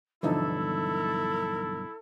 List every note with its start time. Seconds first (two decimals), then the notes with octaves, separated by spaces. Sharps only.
0.23 B1 G2 D3 E3 F3 D#4 E4 A4